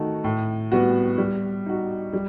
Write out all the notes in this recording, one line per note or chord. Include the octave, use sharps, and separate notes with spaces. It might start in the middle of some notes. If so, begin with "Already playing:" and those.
Already playing: D#3 A3 D#4 F#4
A2
G3 B3 F#4
G3
D#4 F#4
G3